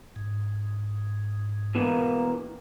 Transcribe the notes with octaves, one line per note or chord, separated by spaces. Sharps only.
G#2
B2 E3 A#3